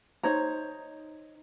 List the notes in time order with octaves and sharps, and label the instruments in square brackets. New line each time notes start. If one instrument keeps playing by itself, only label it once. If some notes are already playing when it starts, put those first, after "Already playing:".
[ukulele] D#4 C5 C#5 A#5